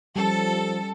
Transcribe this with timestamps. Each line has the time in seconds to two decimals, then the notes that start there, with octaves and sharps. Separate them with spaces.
0.16 F3 G3 C#4 A4